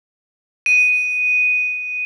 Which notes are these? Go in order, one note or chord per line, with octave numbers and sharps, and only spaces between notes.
D#7